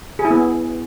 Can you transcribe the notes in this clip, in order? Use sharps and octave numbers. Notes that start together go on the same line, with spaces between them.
G#4
E4
B3